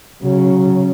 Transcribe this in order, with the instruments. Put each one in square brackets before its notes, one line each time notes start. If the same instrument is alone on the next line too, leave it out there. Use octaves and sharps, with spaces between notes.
[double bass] C#3 [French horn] F#3